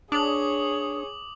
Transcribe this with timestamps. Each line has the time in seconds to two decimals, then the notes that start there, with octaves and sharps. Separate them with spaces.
0.12 D4 G#4 C#5 D6 D#6 F#7